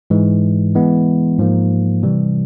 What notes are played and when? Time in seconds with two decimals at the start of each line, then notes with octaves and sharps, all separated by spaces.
0.10 G#2 E3 G#3
0.75 E3 G#3 B3
1.38 G#2 F3 A#3
2.03 C3 E3 G3